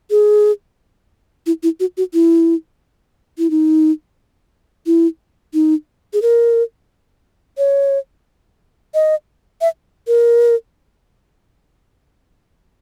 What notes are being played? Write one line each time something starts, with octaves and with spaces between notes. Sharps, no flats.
G#4
E4
E4
F#4
F#4
E4
E4
D#4
E4
D#4
G#4
A#4
C#5
D#5
E5
A#4